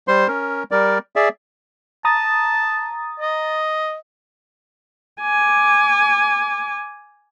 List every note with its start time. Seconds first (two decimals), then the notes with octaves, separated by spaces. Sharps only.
0.08 G3 C5 C6
0.28 C#4 A#4
0.71 G3 A#4 D5
1.16 G#4 D5 E5
2.05 A5 A#5 D#6 A6
3.20 D#5
5.21 G#5 D6